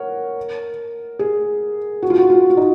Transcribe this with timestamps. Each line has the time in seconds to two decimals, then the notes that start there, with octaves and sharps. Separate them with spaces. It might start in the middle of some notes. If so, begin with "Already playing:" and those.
Already playing: A#4 C#5 F#5
1.19 G#4
2.02 F#4
2.10 F4
2.18 F#4
2.30 F4
2.50 F4
2.57 D#4